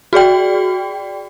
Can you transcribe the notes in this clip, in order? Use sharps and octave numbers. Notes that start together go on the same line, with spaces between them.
F#4 G#4 D5 G5